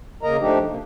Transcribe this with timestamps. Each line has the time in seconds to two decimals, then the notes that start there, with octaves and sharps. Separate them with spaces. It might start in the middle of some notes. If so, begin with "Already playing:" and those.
0.23 C#3 A#3 A#4 D#5 A#5
0.40 F3 A3 D4 D#4 G4
0.68 F#2 C3 A#3